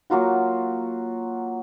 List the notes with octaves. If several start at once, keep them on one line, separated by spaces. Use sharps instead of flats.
F#3 A#3 F4 F#4